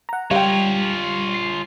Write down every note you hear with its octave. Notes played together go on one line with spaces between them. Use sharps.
F#5 A#5
G3 F4 C#5 F5 G5
C7